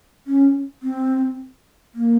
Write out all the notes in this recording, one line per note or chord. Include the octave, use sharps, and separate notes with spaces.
C#4
C4
A#3